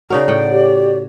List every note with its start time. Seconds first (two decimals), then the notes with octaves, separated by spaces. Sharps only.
0.10 C#3 D#4 F#4 A#4 C#5 D5
0.28 A2 F#5 G5
0.51 G4